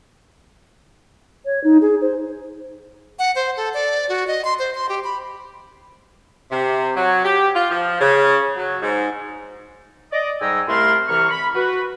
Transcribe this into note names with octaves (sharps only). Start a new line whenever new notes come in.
C#5
D#4
G#4
C5
F#5
C5
A4
D5
F#4
D#5
C6
C5
C6
G4
B5
C3
F#3
G4
F4
F3
C#3
F#3
G#2
D5 D#5
G#2 G3 G5 G#5 A#5 E6
C2 A3 E4 A#4 F5 C6
C2 E3 A#5 C#6 F6
B5
F#4 B4